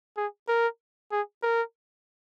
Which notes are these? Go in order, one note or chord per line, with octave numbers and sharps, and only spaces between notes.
G#4
A#4
G#4
A#4